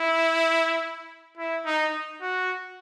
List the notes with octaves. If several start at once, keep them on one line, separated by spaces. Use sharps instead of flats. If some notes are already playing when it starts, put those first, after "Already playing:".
Already playing: E4
E4
D#4
F#4